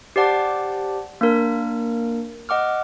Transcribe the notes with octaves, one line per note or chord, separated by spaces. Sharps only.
G4 C5 D5 F#5 A5 D6
A#3 D4 A#4
D#5 F#5 D6 F6